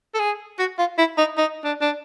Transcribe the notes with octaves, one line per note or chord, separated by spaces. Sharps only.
A4
G#4
F#4
F4
E4
D#4
D#4
D4
D4